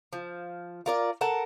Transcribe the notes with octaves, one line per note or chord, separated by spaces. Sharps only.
F3
F4 A#4 D5
A4 A#4 F#5 A5